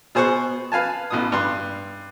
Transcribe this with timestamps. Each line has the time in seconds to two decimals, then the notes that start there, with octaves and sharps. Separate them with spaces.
0.15 B2 G#4 C5 C6 C#6 F#6
0.72 B4 F5 G#5 A5
1.10 A1 B2 D#6
1.32 G2 C6